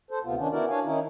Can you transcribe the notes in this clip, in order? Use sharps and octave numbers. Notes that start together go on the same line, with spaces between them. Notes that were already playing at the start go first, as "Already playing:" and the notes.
A4 C5
D2 C3 B3 F4
D#3 C#4 D4
B3 E4 F#4 A#4 D5
D4 C#5 F5 G#5
D#3 C#4 D#4 E4